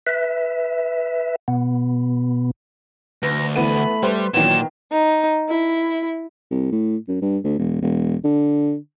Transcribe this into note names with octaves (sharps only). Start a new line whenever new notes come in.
B4 E5
B2 B3
D2 B4 A#6
E3 A3 B3 B5 D#7
G3 B4 C5
A#2 D#3 E3 F#3 B3 E7
D#4
E4
C2
A2
F#2
G2
D2
E1
E1
D3